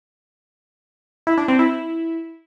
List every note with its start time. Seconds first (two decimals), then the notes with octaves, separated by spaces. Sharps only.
1.27 E4
1.38 D4
1.48 C4
1.59 E4